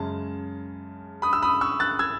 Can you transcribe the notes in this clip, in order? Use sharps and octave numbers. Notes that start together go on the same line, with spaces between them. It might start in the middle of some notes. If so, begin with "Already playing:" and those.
Already playing: F#2 C#3 G#3 A5
B5 D#6
E6
B5 D#6
C#6 E6
F#6 A6
E6 G#6